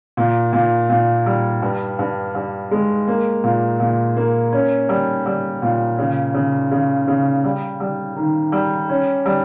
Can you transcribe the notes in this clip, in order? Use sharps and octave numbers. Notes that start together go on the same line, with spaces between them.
A#2
A#2
A#2
G3
G2
G2
G2
G#3
A#3
A#2
A#2
A#3
C#4
G3
G3
A#2
C#3
C#3
C#3
C#3
G3
G3
D#3
G3
C#4
G3